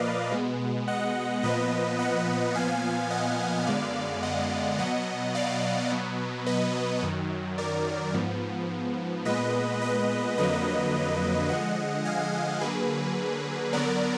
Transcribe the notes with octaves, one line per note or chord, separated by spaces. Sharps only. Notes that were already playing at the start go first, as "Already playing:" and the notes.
Already playing: A#2 F3 A#3 B4 D5 D#5 F5
B2 G#3 B3
D#5 F#5
A#2 F3 B3 B4 D#5
D#5 F#5
A#2 F3 B3 F5 G#5
D#5 F#5
F#2 D3 G#3 B3 D5 F5
D#5 F#5
B2 F#3 B3 D#5 F#5
D5 F5
B2 F#3 B3
B4 D#5
F#2 D#3 F#3
A#4 D5
G#2 F3 B3
A#2 G#3 B3 B4 D#5
B4 D#5
F2 D3 F#3 A#3 B4 D#5
D3 F3 G#3 D#5 F#5
F5 G#5
D3 F#3 A#3 G#4 B4
D3 F#3 B3 A#4 D5